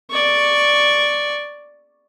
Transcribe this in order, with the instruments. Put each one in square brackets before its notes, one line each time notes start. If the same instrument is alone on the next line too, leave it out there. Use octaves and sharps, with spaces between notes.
[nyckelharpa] D5 C#6